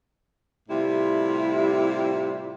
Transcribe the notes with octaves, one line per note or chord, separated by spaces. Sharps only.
A2 C3 G3 E4 F4